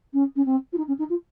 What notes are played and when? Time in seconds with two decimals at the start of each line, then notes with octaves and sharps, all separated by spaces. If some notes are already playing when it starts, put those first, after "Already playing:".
0.13 C#4
0.36 C#4
0.46 C4
0.73 F4
0.78 D#4
0.88 C#4
0.99 D#4
1.10 F4